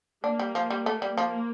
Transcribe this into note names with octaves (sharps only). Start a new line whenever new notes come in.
A#3 D4
G3
F3
G3
A3
G3
F3 A#3